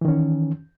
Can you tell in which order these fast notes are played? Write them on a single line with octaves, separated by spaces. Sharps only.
E3 D#3 C#4